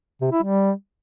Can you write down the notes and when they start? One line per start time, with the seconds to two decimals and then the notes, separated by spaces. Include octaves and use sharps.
0.22 C3
0.32 E4
0.43 G3